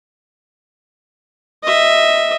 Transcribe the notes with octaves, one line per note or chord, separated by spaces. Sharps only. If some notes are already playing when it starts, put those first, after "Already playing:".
D#5 E5